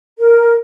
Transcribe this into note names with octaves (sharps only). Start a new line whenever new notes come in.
A#4